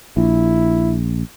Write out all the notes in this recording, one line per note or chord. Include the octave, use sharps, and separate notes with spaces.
A#1 E4